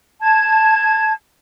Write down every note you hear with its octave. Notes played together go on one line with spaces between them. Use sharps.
A5 G#6